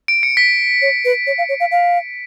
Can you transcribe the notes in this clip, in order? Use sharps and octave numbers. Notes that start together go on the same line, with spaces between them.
D7
C#7
B6
C#5
B4
C#5
F5
C#5
F5
F5